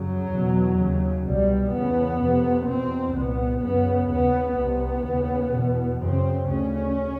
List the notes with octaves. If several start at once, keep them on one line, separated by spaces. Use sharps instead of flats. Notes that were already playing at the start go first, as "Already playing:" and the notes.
Already playing: F#2 C#3 F#3
E2 B2
D#2 C#3
C2 B2 G3
E2 C#3 B3
F2 C3
E2 B2 C4
C2 A#2 B3
F#2 C#3 B3
D#2 C#3 B3
C2 C3 B3
D#2 C#3
E2 B2
F#2 C#3 C4
D2 C#3 C#4